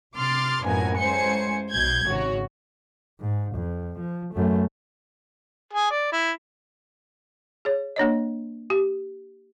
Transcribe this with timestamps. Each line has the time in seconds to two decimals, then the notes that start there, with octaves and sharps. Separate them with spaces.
0.16 C3 C6 D6 F6 A6
0.64 A#1 F#2 A2 B3 A#4 G#5
0.99 A1 G#3 C5 G#5 C#7
1.70 B1 B2 G6 G#6
2.04 G#1 C#3 F#4 C#5
3.20 G#2
3.55 F2
3.99 F3
4.34 F#2 A3
5.74 G#4
5.91 D5
6.13 E4
7.65 G#4 C#5
7.96 A#3 D4 C#5 D#5
8.70 G4